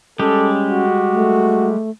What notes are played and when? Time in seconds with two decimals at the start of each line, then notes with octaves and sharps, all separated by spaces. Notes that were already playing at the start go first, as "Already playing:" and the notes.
0.20 G3 G#3 C#4 G4 A4
0.69 F#4
1.13 A3